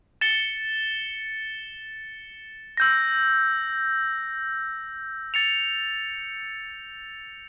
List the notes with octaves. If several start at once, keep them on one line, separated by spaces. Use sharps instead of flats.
A6 C#7 E7 G7
E6 G6 A#6
A6 C#7 F7